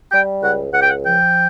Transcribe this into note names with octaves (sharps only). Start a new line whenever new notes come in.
G3 G5
C#2 F#5
C#2 F#5
G5
F#5
F3 G5